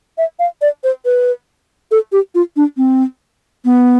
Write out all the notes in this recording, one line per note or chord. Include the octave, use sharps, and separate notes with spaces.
E5
F5
D5
C5
B4
A4
G4
F4
D4
C4
B3